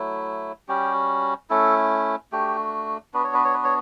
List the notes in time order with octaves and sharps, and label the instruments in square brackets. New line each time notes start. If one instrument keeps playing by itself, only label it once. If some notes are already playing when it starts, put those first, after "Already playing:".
Already playing: [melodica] F#3 A3 E4
G3 C#4 F#4 G4
A3 C#4 E4 A4
A3 D4 F#4 G4
B3 D4 F#4 B4
C#5
B4
C#5
B4
C#5